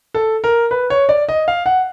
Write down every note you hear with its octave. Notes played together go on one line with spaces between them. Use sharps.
A4
A#4
B4
C#5
D5
D#5
F5
F#5